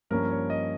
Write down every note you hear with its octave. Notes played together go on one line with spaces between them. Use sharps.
G2 F3 A#3 C#4 A#4
C#5
D#5